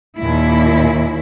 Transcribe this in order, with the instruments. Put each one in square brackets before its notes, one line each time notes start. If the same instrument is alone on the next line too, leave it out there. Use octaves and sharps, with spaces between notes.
[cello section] D#2 A#2 E4